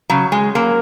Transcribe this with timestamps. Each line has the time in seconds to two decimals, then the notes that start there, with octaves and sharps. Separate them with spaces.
0.10 C#3 F#3
0.32 G#3
0.55 F#3 A#3